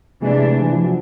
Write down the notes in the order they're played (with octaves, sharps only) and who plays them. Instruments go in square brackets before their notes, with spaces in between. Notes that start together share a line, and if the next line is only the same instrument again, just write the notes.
[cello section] C3 E3 A3 D4 [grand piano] G#3
[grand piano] E3
F3
F#3